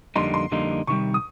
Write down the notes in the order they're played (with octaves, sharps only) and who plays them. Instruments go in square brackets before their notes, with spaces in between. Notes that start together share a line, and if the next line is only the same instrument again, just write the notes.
[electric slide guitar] F2 D3 G3 A#3 D#4 [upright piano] C6
[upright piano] C6
[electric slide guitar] F2 D3 G3 A#3 D#4
[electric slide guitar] C3 D#3 G3 [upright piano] C#6
[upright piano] D#6